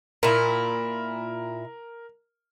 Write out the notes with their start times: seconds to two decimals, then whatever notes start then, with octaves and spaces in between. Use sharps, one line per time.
0.23 A#2 E4 A#4